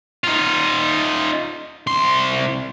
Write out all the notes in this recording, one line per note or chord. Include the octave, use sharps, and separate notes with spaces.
D#4 F4
C2 C6